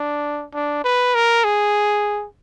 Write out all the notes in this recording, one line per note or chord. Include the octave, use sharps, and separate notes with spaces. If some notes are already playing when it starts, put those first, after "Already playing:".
Already playing: D4
D4
B4
A#4
G#4